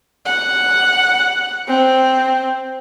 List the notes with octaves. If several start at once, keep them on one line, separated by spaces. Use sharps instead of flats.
F#5
C4